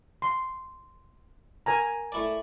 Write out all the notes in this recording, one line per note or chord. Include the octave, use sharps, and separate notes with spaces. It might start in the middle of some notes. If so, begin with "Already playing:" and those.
C6
A#4 G#5 A#5
A3 E4 D5